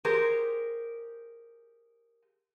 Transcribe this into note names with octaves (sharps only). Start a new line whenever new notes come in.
G4 G#4 A#4 C5